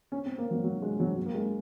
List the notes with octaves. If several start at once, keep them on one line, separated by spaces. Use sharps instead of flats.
C#4
C4
A#3
F#3
F#3
G#3
F#3
F#3
A#3
G#3